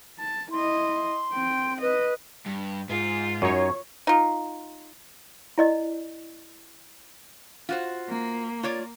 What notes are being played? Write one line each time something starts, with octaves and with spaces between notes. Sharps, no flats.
A5
E4 D#5 C6
C4 G5
B4 D#5
G2
G#2 F4
F#2 D#4 C#5
D#4 F4
E4 D5 D#5
F4 F#4 C5
A#3
F4 C#5 D5